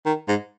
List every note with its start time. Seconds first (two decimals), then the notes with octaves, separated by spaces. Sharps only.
0.06 D#3
0.28 G#2